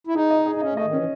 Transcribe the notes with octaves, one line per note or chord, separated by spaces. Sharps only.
E4
D#4 G#4
D#5
G#4
D#4
C#4 D#5
A3 D#5
D#3
E3 C#4